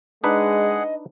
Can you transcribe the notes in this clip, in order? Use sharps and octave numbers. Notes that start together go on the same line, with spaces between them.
G#3 D4 D#4 G#4 B4 D#5 F#5